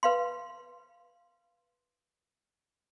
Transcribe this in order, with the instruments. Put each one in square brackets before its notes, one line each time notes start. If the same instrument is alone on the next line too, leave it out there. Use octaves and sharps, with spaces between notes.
[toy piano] B4 F5 C6